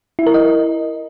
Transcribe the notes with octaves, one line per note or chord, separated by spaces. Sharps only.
E4
A#4
D#5